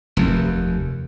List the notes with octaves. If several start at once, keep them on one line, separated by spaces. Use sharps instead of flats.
F1 D#2